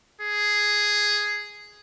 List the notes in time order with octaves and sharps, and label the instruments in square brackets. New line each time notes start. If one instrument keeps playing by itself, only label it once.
[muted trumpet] G#4